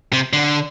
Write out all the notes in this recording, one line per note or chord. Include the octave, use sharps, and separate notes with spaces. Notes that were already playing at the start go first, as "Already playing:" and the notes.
C3
D3